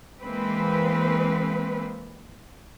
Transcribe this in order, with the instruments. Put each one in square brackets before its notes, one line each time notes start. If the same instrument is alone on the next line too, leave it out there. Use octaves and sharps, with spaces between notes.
[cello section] E3 G#3 A#3 C4 B4